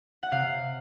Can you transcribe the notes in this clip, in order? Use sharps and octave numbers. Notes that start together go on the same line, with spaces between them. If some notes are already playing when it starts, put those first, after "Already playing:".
F#5
C3 F5